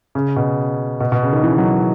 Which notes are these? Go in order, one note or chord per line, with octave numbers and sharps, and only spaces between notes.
C#3
B2
B2
B2
C#3
D#3
E3
F#3